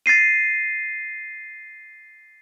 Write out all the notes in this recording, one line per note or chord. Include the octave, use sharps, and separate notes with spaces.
A6 A#6 C7 D#7